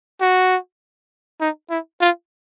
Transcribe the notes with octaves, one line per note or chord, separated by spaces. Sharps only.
F#4
D#4
E4
F4